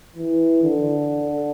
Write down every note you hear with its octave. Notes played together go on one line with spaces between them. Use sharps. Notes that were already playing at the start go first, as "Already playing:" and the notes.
E3
D3